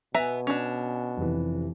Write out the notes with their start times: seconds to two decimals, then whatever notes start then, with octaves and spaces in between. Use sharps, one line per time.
0.15 B2 B3 B4 E5 G#5 A#5
0.47 C#4 D4
1.17 F1 C3 E3